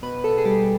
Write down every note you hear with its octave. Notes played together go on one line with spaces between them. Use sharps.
B2 B4
B2 A4
G#4
G3 G4